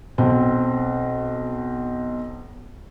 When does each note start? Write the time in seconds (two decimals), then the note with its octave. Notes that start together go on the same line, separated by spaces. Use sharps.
0.18 B1 C4